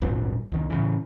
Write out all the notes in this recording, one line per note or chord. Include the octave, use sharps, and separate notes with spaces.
D1 G#1 G2 A#2
C2 D#3
A2 C#3 E3